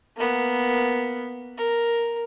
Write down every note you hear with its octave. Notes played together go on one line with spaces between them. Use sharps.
A#3 B3
A#4